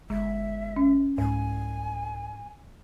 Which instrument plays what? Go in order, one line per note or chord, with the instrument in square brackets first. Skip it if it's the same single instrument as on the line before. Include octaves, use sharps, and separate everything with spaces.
[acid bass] G1 [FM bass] G#3 [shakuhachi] E5
[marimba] C#4
[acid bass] C2 [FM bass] G#2 [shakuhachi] G#5